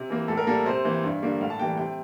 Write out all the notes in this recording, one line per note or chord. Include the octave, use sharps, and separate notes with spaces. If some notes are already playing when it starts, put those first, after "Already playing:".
Already playing: C3
E3 A#3
A2 A4
A#4
G3 A#3 A4
C3 C5
E3 A#3
G2
D3 G3 A#3
A2 F5
A5
E3 G3 A#3 G5
C3 G5